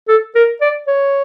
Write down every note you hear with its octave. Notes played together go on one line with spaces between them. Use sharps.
A4
A#4
D5
C#5